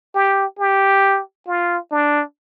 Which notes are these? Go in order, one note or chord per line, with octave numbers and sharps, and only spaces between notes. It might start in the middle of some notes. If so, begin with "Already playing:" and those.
G4
G4
F4
D4